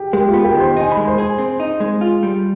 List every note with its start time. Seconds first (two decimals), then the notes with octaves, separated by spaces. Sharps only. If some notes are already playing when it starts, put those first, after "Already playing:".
Already playing: G4 G#4
0.13 G#3 G4
0.28 F4
0.34 B3
0.45 G4
0.55 D#3
0.60 C5
0.77 D#4 G#5
0.91 B5
0.97 G#3
1.07 C5
1.18 G#4
1.38 C4
1.60 D#4
1.80 G#3
2.01 F4
2.23 G3